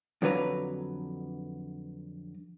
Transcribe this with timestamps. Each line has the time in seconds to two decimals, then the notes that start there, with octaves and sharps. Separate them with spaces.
0.22 F2 D3 F#3 B4 A#5